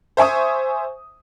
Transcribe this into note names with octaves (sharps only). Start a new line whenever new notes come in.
C5 E5 G#5 C#6 D#6